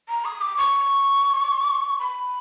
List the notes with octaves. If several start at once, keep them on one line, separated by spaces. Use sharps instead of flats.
A#5
D#6
D6
C#6
B5